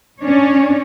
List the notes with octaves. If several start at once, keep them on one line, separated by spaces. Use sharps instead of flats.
C#4 D4 C#5